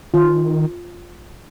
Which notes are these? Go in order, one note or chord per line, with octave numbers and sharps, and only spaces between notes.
D#3 F4